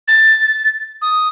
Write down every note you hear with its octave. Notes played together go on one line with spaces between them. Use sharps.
A6
D#6